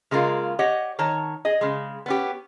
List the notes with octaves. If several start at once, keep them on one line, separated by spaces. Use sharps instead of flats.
C#3 G#3 A#3 F4 A#4
G4 C#5 D#5 F#5
D#3 C#5 A5
G#4 D#5
C#3 G#3
B3 C#4 G4